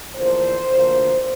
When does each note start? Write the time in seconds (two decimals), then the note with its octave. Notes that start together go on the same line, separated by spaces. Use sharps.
0.16 E2 D3 F3 A#3 D4 C5
0.70 D2 D3 F3 A#3